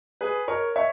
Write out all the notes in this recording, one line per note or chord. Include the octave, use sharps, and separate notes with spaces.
G#4 B4
A#4 C#5
C#5 E5